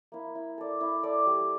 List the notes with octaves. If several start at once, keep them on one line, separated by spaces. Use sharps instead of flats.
A#3 E4
E4
A4 D5
E4
A4 D5
G3